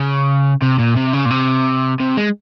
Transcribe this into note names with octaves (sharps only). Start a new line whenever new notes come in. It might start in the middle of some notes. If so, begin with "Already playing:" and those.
Already playing: C#3
C3
A#2
C3
C#3
A#2
C3
C3
G#3